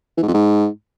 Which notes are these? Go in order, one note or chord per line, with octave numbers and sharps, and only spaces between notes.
E3
G#2
F2
G#2